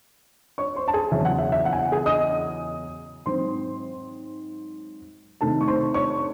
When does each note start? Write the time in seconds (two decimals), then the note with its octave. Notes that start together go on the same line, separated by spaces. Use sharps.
0.58 C#5 C#6
0.76 C5 C6
0.88 A5
0.94 G#4 G#5
1.11 E2 C#3 F#3 C#4 E5
1.25 F#5
1.38 E5
1.52 E5
1.65 F#5
1.73 G#5
1.79 F#5
1.92 G#4 G#5
2.06 D#5 D#6
3.26 G#2 F#3 C4 C5 C6
5.41 C3 D#3 A3 A4 A5
5.61 C#6
5.67 C5 C6
5.94 C#5 C#6